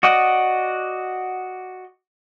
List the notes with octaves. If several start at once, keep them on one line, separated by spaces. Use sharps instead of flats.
F#4 D5 D#5 F#5